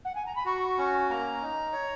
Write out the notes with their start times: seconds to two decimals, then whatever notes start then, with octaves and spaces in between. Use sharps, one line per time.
0.04 F#5
0.15 G#5
0.26 A#5
0.35 B5
0.45 F#4 C#6
0.78 C#4
1.09 A#3 A#5
1.42 D#4
1.73 C#5